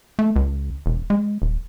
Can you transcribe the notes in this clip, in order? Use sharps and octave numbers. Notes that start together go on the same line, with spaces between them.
A3
C#2
E1
G#3
D#1